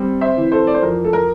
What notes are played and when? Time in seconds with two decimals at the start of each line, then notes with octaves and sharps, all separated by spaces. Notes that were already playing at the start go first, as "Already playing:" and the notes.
Already playing: G3 C4
0.21 C5 E5
0.37 E3
0.52 A4 C5
0.67 D5
0.74 C5
0.82 F2 A#4
1.05 A4
1.13 A#4